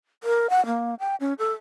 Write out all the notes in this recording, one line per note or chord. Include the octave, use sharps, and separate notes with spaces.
A#4
F#5
A#3
G5
C#4
A4